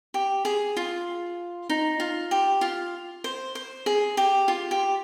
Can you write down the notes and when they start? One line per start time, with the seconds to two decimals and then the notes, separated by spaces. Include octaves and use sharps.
0.14 G4
0.45 G#4
0.77 F4
1.69 D#4
2.00 F4
2.31 G4
2.61 F4
3.24 C5
3.55 C5
3.86 G#4
4.17 G4
4.48 F4
4.71 G4